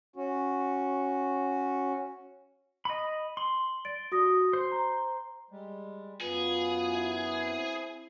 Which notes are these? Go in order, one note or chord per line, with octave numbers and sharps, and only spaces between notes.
C#4 F#4
D#5 B5
C6 F#7
D5 A6 D7
F#4 D#6 A#6
C5
A#5
G3 G#3
F#2 B3 F4 G#4 B4
E4
C4